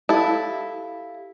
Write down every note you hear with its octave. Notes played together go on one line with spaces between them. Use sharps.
E4 G4 A4 F5